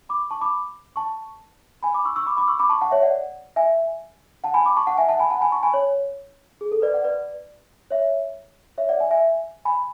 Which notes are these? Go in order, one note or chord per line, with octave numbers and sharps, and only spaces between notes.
B5 D6
A5 C#6
B5 D6
A5 C#6
G#5 B5
B5 D6
C#6 E6
C#6 E6
B5 D6
B5 D6
C#6 E6
B5 D6
A5 C#6
F#5 A5
C#5 E5
D5 F#5
E5 G#5
F#5 A5
G#5 B5
B5 D6
A5 C#6
F#5 A5
E5 G#5
F#5 A5
G#5 B5
F#5 A5
G#5 B5
A5 C#6
G#5 B5
C#5
G#4
A4
B4 D5
D5 F#5
B4 D5
C#5 E5
C#5 E5
D5 F#5
E5 G#5
E5 G#5
G#5 B5